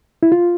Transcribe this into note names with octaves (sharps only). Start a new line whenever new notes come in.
E4
F4